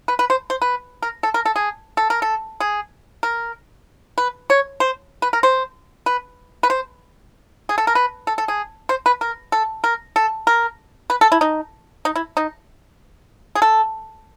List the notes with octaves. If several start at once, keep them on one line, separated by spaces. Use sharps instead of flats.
B4
B4
C5
C5
B4
A#4
A4
A#4
A4
G#4
A4
A#4
A4
G#4
A#4
B4
C#5
C5
B4
A#4
C5
B4
B4
C5
G#4
A4
A#4
B4
A4
A4
G#4
C5
B4
A#4
A4
A#4
A4
A#4
B4
A4
E4
D#4
D#4
E4
D#4
G#4
A4